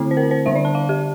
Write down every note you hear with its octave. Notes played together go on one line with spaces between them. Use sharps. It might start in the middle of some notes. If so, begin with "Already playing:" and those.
Already playing: D3 A3 C4 E4
C5
A#4
C5
D3 G3 D4 E5
D5
A5
F5
G4